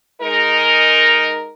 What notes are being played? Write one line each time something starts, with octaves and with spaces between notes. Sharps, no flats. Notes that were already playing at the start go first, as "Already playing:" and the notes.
G#3 D#4 A#4